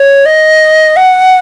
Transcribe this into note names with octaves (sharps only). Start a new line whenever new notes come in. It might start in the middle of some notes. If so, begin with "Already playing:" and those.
Already playing: C#5
D#5
F#5